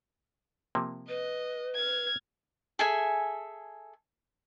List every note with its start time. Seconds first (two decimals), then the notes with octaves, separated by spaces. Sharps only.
0.75 C3 F3 A#3
1.09 B4 D#5
1.76 F6 G#6
2.79 G#4 A4 E5 G#5